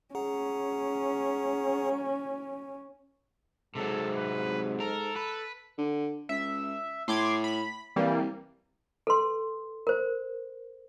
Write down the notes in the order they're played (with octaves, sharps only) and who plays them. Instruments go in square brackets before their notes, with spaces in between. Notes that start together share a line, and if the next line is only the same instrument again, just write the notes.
[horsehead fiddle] C#4 [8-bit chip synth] G#4 F#5 A#5
[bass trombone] G#2 [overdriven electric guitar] C3 F#3 [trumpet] A4
[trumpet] B4
[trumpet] A4 [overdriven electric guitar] A#4
[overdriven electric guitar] B4
[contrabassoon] D3
[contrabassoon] C#2 [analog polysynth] E5
[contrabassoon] A2 [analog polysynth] C6 D6 G#6
[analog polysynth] B5
[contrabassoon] C2 [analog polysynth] E3 G3 A#3
[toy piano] A4 B4 C6
A#4 C5